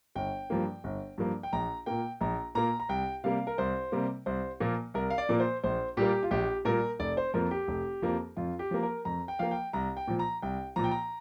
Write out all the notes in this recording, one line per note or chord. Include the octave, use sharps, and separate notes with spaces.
G1 G5
G2 F3 A#3
G1
G2 F3 A#3
G5
A#1 A#5
A#2 A#3 G5
A#1 A#5
A#2 A#3 A#5
A#5
C2 G5
C3 G3 A#3 F5
A#4
C2 C5
C3 G3 A#3
C2 C5
A#2 F3 A#3
C2 A#4
F5
D5
A#2 F3 A#3
C5
A#1 C5
A#2 G3 A#3 G4
F4
A#1 G4
A#2 G3 A#3 A#4
F1 D5
C5
F2 F3 A#3 A#4
G4
F1
F2 F3 A#3
F2 F4
G4
F3 A#3
A#4
F2 A#5
G5
F3 A#3 F5
G5
C2 A#5
G5
A#2 F3
A#5
C2 G5
A#2 F3 A#5
G5
A#5